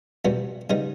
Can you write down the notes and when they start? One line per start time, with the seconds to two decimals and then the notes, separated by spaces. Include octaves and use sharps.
0.25 E2 B2 G3 B3
0.70 C#3 G3 B3 D#4